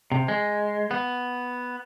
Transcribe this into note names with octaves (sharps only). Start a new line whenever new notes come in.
C3
G#3
B3